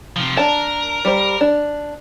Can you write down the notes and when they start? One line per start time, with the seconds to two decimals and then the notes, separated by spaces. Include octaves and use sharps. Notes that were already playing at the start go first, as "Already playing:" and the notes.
0.16 C3 F3
0.37 D4 A#4 A5
1.05 G3 C5
1.41 D4